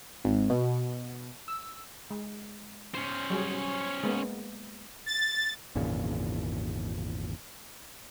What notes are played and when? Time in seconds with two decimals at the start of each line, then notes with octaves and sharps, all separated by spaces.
0.24 G#1
0.50 B2
1.48 E6
2.11 G#3
2.95 C#4 C5
3.30 F#3 G3 G#4
4.03 G#3 A#3 B3
5.06 A6
5.75 G#1 E2 A#2 C#3